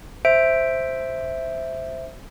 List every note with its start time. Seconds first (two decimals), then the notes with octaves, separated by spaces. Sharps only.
0.25 C5 E5 D7